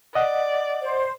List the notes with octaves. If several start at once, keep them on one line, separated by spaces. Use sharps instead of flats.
D5 D#5 F#5
C5